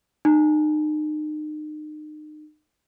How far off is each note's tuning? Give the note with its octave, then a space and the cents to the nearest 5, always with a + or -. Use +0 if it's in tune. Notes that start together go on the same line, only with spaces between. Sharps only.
D#4 -35